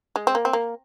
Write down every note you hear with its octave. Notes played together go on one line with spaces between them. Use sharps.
G#3
C4
A#3
C4
A#3